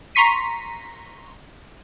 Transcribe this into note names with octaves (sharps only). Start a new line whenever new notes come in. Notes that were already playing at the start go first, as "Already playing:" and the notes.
A#5 C6 C#6 B6 D#7